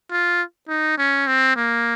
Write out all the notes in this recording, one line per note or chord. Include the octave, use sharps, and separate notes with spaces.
F4
D#4
C#4
C4
A#3